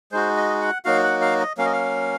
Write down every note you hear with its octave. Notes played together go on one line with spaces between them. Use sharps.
G#3 D#4 F#4 C5
D#5
F#5
F#3 A#3 D#4 F#4 F5
F#5
F5
D#5
F#3 A#3 C#4 F5
D#5
F5